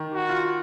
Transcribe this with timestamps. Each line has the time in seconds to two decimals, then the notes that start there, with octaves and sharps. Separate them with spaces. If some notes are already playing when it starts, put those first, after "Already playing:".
Already playing: D#3
0.14 F#4
0.29 F4